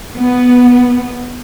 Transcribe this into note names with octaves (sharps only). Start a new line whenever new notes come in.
B3